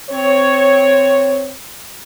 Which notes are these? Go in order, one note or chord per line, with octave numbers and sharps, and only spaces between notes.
C4 C#5